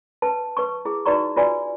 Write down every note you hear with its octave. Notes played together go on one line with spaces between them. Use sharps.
B4 A5
B4 C#6
E4 G#4
D#4 F#4 B4 D5 A#5 C#6
F4 F#4 B4 D5 G#5